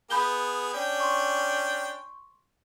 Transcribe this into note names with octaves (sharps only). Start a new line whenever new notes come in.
B3 G#4 B5 G6 G7
C#4 D4 G5
C6 C#6